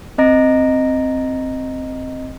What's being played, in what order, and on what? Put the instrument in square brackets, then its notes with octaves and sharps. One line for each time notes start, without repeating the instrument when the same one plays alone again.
[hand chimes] C4 D#5 A#5 A#6 D7